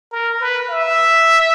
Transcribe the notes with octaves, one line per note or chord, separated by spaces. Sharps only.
A#4
B4
E5